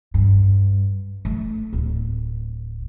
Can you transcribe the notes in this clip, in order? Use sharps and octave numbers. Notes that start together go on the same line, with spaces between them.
G2
A3
D1